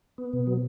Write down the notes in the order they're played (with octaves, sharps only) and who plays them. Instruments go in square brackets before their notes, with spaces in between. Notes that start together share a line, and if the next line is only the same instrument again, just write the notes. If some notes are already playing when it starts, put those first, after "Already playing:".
[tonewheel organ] B3
B2
F#3